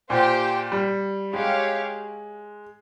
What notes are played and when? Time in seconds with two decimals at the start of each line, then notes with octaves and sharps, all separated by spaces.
0.10 A#2 G4 C5 G5
0.72 G3
1.33 G#3 G4 C#5 F5